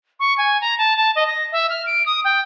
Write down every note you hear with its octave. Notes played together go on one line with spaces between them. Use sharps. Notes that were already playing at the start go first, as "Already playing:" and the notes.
C#6
G#5
A#5
A5
A5
D#5
A#6
E5
F6
D7
D#6
G5